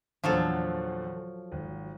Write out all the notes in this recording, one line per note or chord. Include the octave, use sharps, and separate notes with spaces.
E2 A#2 D3 F3 F#3 A4
G#1